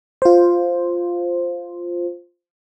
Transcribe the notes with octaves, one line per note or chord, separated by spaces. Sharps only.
F4 C5